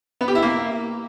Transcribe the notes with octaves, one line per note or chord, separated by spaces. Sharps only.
B3
G4
E4
A#3